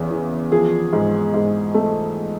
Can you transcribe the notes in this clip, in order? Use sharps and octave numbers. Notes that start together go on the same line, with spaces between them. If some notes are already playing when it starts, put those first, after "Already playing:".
Already playing: E2 C#3
E3
F3 G#4
G#2
G#2
A3